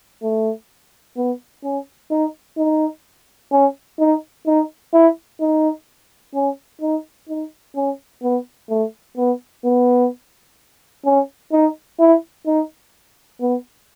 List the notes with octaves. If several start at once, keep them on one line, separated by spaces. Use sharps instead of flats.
A3
B3
C#4
D#4
D#4
C#4
D#4
D#4
E4
D#4
C#4
D#4
D#4
C#4
B3
A3
B3
B3
C#4
D#4
E4
D#4
B3